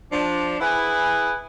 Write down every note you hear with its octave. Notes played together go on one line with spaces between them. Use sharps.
F3 D4
E4 G#4 B4 F#5 G#5